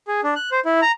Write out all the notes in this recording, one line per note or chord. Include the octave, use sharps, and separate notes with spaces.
G#4
D4
F#6
C5
E4
A#5